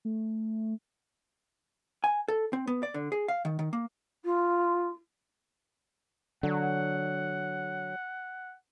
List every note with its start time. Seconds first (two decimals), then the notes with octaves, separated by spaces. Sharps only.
0.05 A3
2.04 G#5
2.28 A4
2.53 C4
2.67 B3
2.83 D5
2.94 D3
3.12 G#4
3.28 F5
3.45 D#3
3.59 D#3
3.73 A#3
4.24 F4
6.43 D3 F#3 F#5